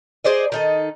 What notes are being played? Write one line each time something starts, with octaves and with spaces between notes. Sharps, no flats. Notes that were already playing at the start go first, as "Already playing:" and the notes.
G#4 C5 D5 D#5
D#3 D#4 A4